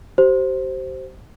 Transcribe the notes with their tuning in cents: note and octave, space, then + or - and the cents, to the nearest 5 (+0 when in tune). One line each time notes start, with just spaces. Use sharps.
G4 -40 C5 +0